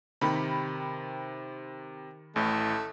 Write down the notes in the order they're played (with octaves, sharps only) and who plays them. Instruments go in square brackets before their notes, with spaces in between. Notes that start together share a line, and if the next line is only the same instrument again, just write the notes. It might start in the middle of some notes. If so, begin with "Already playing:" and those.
[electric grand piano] C3 [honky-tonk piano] D#3 G4 B5
[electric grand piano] A1 A2 [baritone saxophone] A3